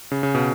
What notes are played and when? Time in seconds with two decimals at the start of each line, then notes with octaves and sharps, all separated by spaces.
0.11 C#3
0.23 C#3
0.35 B2